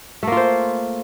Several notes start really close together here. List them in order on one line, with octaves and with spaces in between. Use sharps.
A3 A#3 F4 C5